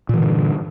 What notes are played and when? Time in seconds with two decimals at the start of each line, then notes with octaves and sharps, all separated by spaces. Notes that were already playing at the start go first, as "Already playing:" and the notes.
0.09 A#2
0.14 E3
0.18 D3
0.23 G2